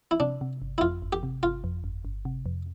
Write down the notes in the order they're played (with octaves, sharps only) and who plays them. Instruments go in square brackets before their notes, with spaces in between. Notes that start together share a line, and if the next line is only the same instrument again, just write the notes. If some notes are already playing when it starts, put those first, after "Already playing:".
[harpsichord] E4
[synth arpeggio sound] C3 [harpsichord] D4
[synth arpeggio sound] C3
G1
[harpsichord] E4
[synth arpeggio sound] F2 [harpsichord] F4
[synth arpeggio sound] G1
[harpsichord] G4
[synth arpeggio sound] C3
[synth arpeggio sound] G1 [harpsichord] F4
[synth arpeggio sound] F2
G1
G1
C3
F2